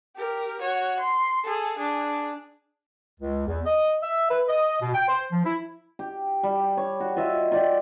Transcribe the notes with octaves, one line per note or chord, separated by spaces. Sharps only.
G4 A#4
F#4 C#5
C6
G#4 A4
D4 G#4
C#2
E2
D#5
E5
B4
D#5
B2
G5
C5
F3
E4
G4
G3
C#5
F#4
F4 D#5 E5
F4 D5 G5